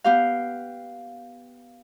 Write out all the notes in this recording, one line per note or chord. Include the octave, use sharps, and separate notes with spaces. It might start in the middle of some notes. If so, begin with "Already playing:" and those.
B3 G4 F5